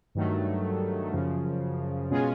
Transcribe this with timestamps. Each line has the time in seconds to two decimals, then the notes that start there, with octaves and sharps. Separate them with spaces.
0.15 G2 D#3 F#3 A3
1.12 F#2 C#3 F3
2.11 B2 G#3 C#4 F4 G#4